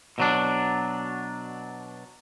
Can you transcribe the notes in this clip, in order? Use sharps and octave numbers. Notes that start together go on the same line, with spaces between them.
B2 F#3 D4